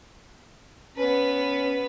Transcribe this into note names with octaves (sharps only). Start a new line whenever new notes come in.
B3 C#4 B4